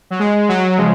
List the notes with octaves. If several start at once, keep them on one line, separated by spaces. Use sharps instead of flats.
F#3
G#3
F#3
C#3 F3 G#3